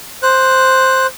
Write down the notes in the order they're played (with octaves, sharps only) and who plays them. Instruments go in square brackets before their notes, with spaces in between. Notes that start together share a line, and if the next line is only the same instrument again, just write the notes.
[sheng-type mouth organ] C5 F#6